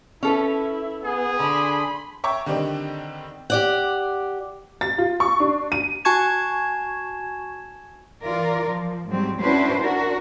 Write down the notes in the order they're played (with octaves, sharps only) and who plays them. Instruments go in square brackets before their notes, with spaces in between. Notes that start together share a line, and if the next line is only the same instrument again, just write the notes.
[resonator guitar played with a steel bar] C#4 A4 B4 [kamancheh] E4
[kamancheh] B3 [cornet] G#4
[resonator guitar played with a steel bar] D3 D4 [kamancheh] B5 C6
[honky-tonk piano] C#5 E5 G5 A#5 C#6 D6
D3 D#3 G3 C4 D4 D#4
[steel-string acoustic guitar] G4 D5 F#5
[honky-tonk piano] A6
F4
C#6
D4
D#7
[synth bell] F#4 G#5 A5 C#6 G#6 E7
[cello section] E3 F4 A#4 D5
F3
G#2 F#3 G3 C4
C#4 D4 E4 F#4 B4 C5
D4 F#4 A#4